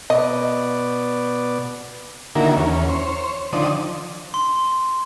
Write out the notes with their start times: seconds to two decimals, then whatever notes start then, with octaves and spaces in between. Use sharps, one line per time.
0.10 B2 D5 D#5
2.35 D3 D#3 A#3 E4 F#4 A#4
2.56 E2 C#4
2.88 C5 C#5
3.53 D3 D#3 F3 C5 D5 D#6
4.34 C6